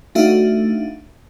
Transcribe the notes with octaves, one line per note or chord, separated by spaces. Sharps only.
A3 D4 D#4 F#4 E5 F5